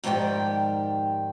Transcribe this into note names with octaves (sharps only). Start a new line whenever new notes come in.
F2 G#2 D#3 G4 D5 G5